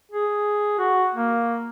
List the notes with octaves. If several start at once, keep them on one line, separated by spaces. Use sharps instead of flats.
G#4
F#4
A#3